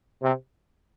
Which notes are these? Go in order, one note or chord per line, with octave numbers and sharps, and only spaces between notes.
C3